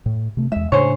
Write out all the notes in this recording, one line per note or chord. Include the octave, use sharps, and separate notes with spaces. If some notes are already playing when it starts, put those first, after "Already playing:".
A2
C3 A3
E2 G#3 E5
A2 C#3 D4 G#4 C5 C#5